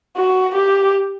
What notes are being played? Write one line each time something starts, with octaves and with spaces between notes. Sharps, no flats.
F#4
G4